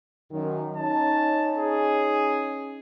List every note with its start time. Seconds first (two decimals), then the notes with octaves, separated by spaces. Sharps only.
0.31 F#2 D#3
0.77 C#4 D#4 A5
1.57 G#4